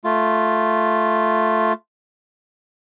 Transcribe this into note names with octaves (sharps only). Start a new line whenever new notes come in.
A3 F4